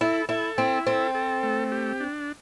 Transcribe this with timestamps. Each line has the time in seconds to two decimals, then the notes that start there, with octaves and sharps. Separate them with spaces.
0.01 E4 A4
0.29 E4 A4
0.58 C4 E4
0.87 C4 A4
1.15 A4
1.43 A3
1.72 G4
2.00 D4